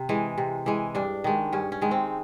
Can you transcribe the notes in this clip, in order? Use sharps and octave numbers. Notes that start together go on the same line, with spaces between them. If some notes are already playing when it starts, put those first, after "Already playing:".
Already playing: C3
E3 G#3
C3
E3 G#3
G2 D4
D#3 G#3
G2 C#4
C#4
D#3 G#3
C4